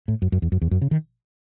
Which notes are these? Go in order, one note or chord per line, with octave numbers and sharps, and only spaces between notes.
A2
F#2
F#2
E2
F#2
E2
F#2
C#3
D#3